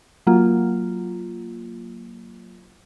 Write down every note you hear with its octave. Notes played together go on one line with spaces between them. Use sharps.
F#3 A#3 F4